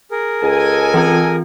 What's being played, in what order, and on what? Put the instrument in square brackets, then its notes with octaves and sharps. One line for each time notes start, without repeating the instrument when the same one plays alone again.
[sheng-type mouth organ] G#4 A#4
[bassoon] C#2 [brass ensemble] A4 D#5 G#5
[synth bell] E3 C4 F4